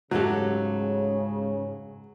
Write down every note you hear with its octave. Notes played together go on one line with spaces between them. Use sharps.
C#2 G#2 C#3 F#3 A3 G4 A4